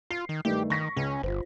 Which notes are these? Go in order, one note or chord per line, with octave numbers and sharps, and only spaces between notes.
F4 C7
D#3
G2 D#3 A3 G4
D#3 C#6 A#6 B6
C#2 C#4
G1 F4 C5